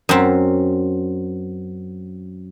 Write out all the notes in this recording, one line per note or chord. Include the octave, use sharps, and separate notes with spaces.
F#2 C4